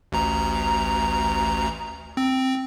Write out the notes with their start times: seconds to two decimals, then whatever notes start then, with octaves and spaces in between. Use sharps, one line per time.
0.12 A1 D2 A#5
2.17 C4